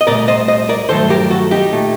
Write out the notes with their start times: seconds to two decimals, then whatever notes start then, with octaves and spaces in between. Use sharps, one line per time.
0.01 D#5
0.07 C2 A#2 A3 A#4 D5
0.28 C5 D#5
0.48 C5 D#5
0.69 A#4 D5
0.89 G2 D#3 F#3 A3 A4 C5
1.10 G4 A#4
1.30 F#4 A4
1.51 D#4 G4
1.73 A#2 A3